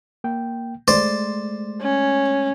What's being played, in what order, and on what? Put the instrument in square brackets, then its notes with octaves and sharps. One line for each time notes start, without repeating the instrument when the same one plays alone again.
[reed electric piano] A#3 G5
[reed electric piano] G#3 A3 [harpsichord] C5 D5
[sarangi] C#4